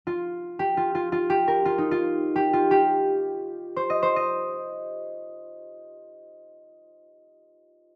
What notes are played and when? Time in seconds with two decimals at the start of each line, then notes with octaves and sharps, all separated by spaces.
0.07 F4
0.59 G4
0.77 F4
0.95 F4
1.12 F4
1.30 G4
1.48 A#4
1.65 F4
1.78 D#4
1.91 F4
2.36 G4
2.53 F4
2.71 G4
3.76 C5
3.90 D#5
4.03 C5
4.16 D#5